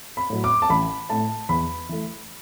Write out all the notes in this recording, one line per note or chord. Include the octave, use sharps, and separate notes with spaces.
B5
A2 F#3
D6
A5
A1 B5
A2 A3 A5
E2 B5
E3 A3